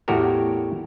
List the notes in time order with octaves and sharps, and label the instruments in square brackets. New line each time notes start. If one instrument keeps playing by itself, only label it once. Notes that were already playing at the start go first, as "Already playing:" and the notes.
[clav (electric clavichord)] E2 A2 F#4 G4 A#4